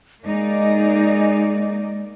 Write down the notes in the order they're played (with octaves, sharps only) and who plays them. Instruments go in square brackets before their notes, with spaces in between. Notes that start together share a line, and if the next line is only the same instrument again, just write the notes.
[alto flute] G#3 [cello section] A#3 D#4 D5